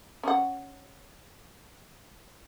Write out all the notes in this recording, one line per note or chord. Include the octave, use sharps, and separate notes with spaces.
C#4 F#5